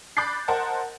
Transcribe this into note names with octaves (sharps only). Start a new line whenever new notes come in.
B5 D6 F#6 G6 A6 C7
A#4 C5 D#5 F#5 A5